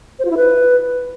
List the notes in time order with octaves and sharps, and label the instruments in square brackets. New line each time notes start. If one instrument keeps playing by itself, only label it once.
[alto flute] C5
F4
E4
B4